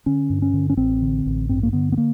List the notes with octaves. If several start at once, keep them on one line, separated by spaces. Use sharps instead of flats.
D3 C#4
G2
C#4
D3
C#4
A1 C4
D3
A1
G2 C4
A#3
D3 B3
B3
A#3